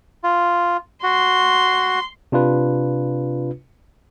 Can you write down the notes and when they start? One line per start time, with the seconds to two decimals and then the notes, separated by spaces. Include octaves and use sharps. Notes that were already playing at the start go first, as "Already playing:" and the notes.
0.24 F4
1.03 F#4 C6
2.32 C3 D4 F4 B4